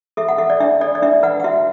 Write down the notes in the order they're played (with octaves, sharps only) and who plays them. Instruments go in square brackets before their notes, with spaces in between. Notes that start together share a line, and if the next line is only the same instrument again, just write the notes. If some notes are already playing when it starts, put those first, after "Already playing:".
[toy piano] A4 E5
F#5
A4 E5
D5
D4 E5
A4 D5
D5
D4 E5
B4 F#5
F#5
F#4 E5